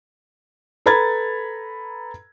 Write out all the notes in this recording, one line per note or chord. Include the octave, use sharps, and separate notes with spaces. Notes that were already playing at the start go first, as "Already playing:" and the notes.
A4 B4 A#5 B5 G#6 A6